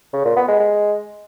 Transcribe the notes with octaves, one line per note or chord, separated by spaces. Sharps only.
C#3
A#2
B3
G#3
G#3